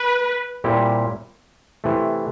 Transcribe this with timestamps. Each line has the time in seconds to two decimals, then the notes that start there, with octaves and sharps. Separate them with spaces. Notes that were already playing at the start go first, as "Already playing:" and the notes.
Already playing: B4
0.64 A#2 G3 C4 E4 G4
1.84 C3 E3 A3